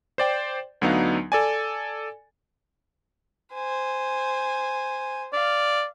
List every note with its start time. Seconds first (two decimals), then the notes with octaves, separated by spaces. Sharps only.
0.18 C5 D5 G5
0.81 D2 F#3 B3 D4 D#4 F5
1.32 A4 D5 G#5
3.54 C5 G#5
5.33 D5 F5